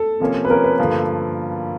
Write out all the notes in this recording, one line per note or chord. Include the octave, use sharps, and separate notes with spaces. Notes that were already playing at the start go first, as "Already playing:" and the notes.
Already playing: A4
C3 F3 A#3 C#4
B4
C3 F3 A#3 C#4 A#4
B4
G2 D3 F3 A#3